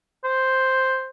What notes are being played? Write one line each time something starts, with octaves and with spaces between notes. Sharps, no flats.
C5